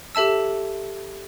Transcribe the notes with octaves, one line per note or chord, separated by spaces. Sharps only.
G4 A4 E5 A5 E6